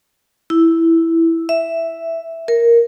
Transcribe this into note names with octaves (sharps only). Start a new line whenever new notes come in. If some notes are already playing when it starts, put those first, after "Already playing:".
E4
E5
A#4